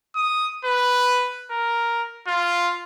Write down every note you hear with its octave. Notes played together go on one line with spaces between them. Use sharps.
D#6
B4
A#4
F4